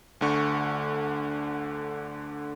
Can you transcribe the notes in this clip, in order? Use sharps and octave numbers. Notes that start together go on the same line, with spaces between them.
D2 D3 C#6